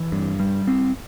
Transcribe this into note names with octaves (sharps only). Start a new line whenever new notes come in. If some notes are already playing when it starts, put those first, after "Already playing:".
Already playing: E3
G2
G3
C4